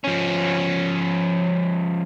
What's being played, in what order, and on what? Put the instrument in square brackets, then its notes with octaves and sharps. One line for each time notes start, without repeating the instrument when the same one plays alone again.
[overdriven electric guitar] F3 C#4